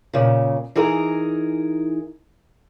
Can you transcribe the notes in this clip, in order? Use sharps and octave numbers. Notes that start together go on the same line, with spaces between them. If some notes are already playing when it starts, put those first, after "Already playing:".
A#2 C#3
E3 D#4 G#4 A#4